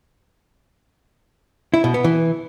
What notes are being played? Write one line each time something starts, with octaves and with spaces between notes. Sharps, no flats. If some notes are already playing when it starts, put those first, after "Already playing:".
E4
B2
B3
E3